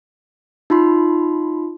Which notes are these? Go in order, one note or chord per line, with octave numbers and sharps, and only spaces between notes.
D#4 F4 B5 C6